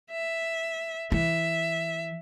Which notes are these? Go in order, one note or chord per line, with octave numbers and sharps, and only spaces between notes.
E5
E3 E5